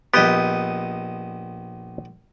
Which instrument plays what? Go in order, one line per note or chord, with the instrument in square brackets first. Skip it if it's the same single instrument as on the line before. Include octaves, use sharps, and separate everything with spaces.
[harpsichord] A#1 D#5 C6 [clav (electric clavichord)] B3 G4